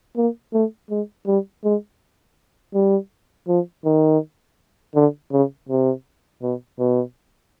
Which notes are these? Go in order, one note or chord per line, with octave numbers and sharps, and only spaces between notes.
A#3
A3
G#3
G3
G#3
G3
F3
D#3
D3
C#3
C3
B2
B2